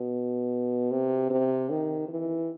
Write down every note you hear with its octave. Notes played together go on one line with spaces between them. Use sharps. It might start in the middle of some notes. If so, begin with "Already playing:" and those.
Already playing: B2
C3
C3
D#3
E3